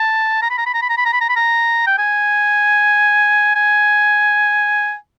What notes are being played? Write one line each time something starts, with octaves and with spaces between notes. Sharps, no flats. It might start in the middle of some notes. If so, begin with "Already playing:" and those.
Already playing: A5
A#5
B5
A#5
B5
A#5
B5
A#5
B5
A#5
B5
A#5
B5
A#5
G5
G#5
G#5